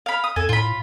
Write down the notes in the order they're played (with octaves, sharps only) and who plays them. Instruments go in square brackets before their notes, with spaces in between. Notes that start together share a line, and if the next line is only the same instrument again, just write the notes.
[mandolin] F5 B5
D#6
[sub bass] F2 [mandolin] A4 G#5
[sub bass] A2 [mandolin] F4 B5